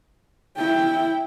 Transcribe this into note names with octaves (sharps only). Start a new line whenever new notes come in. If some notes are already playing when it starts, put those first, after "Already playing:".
E4 G5